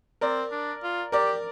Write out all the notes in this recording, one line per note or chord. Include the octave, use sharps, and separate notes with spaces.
C4 A#4 D5
D4
F4
G4 A#4 D5